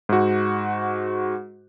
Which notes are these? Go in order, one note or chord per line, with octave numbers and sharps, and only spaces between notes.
G#2 F#4